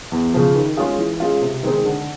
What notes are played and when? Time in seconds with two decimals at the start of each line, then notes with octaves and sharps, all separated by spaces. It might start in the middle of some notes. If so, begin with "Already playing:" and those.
0.12 E2
0.34 C#3 F3
0.55 D#3
0.77 G#3 C#4 F4 G#4
0.98 E3
1.20 G#3 C#4 F4
1.42 C3
1.63 D#3 G#3 C4 D#4
1.85 D3